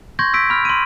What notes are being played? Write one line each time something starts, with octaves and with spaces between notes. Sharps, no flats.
C6 C#6 G6 G#6 A#6
E6 B6 D7
B5 F6
C6 D#7